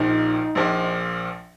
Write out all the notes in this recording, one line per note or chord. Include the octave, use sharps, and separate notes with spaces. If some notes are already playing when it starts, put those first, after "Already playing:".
Already playing: A#1 A#2 F3 D#4
A#1 A#2 F3